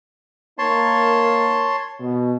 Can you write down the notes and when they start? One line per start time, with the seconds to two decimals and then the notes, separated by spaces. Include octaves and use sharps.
0.58 A#3 D#4 A#4 C#5 A5 C6
2.00 B2